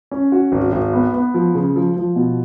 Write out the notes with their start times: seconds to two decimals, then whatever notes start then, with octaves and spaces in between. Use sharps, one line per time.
0.11 C#4
0.32 F#4
0.52 G#1
0.72 G#1
0.93 B3
1.14 B3
1.34 F3
1.55 C#3
1.76 F3
1.96 F3
2.16 B2